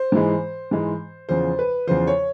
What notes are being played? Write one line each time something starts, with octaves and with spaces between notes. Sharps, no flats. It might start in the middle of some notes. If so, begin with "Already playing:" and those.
Already playing: C5
G#2 E3 G#3
G#2 E3 G#3
E2 C#3 F3 C5
B4
E2 C#3 F3 C5
C#5